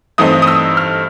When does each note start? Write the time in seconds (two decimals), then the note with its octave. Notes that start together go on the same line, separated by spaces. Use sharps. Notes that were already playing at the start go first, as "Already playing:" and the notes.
0.18 G2 E3 A3 C4 D#4 D#6
0.42 D#6
0.47 E6
0.77 F6